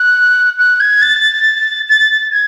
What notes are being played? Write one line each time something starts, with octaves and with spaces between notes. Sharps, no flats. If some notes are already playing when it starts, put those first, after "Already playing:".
Already playing: F#6
F#6
G#6
A6
A6
G#6